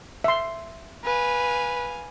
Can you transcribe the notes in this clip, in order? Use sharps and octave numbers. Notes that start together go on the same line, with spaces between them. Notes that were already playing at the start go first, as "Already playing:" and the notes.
E5 C6
B4 F5 G#5